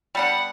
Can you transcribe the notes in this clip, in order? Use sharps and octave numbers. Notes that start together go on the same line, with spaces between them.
G3 B3 D4 F#5